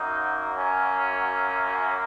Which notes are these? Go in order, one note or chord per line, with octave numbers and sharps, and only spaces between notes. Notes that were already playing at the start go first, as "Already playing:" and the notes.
Already playing: F#2 F#3 A#3 D#4
C#4